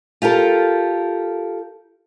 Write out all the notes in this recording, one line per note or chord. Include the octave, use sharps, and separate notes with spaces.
F4 G4 A4 A#4